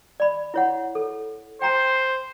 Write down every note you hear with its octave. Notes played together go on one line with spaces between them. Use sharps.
D5 B5
E4 C#5 F#5
A4
C5 G5 A#5